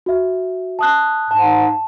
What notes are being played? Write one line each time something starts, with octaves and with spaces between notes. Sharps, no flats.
F#4 E5
A5 D#6 F#6
G#2 A5